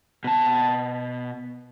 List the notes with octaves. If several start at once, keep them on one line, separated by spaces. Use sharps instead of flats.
B2 A5